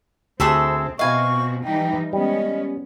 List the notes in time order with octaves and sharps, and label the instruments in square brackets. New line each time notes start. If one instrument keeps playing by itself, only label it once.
[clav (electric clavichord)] D2 [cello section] C4 [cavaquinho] G#4 A4 E5
[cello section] B2 C4 F#4 [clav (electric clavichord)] E4 D#5 [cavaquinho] F5 G#5 [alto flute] C#6
[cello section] E3 G3 D#4 [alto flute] G5
[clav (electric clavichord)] G3 [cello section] G#3 B3 C#4 [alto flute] D#5